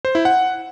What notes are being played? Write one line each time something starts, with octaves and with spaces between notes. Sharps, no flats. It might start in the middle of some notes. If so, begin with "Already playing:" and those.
C5
E4
F#5